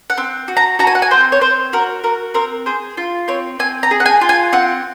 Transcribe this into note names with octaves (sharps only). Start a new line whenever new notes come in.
F#5
C4
F#4
A#5
F#4 A#5
G#5
F#5
G#5
C4 C5
C#5
C4 C5
F#4 A#4
F#4 A#4
C4 A#4
G#4 C5
F4
C4 C#5
C4 G#5
A#5
G#4
F#5
G#5
F4
G#5
C4 F#5